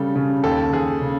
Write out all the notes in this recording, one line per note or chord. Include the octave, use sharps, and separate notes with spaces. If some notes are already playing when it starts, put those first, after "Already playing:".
Already playing: C#3 G3 A4
C#3
D#2 A4
D#2 G#4
C#3